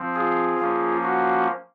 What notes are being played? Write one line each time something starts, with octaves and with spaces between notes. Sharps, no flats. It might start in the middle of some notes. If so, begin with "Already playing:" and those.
Already playing: F3 C4
F4 G#4
F3 A#3 C#4
F#4